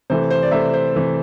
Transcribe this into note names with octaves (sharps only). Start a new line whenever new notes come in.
C3 E3 A3 C5
C5
D5
C3 E3 A3 E5
C5
C3 E3 A3